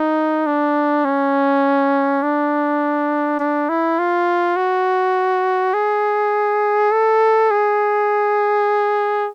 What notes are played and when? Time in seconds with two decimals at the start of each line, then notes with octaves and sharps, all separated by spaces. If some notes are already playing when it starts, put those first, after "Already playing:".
Already playing: D#4
0.47 D4
1.05 C#4
2.23 D4
3.40 D4
3.69 E4
3.99 F4
4.57 F#4
5.74 G#4
6.92 A4
7.51 G#4